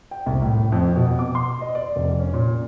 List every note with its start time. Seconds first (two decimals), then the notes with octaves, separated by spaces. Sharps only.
0.11 G5
0.26 C2
0.42 A2
0.72 F2
0.96 B2
1.19 D6
1.35 C6
1.61 D#5
1.75 D5
1.96 F1
2.20 C#4
2.33 A#2